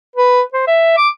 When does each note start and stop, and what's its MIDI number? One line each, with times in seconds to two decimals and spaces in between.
0.16 0.42 71
0.53 0.63 72
0.67 0.94 76
0.97 1.08 86